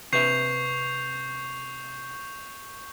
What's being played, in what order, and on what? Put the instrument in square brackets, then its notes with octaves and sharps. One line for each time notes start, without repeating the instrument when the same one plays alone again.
[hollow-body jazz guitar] C3 B4 E5 [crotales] C#6 G6 F7 [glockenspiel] C7